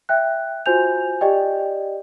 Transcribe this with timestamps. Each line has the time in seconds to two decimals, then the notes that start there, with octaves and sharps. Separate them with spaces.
0.09 E5 G5 F#6
0.66 F4 F#4 C5 G#5 G6 F7
1.21 G4 D5 D#5 G5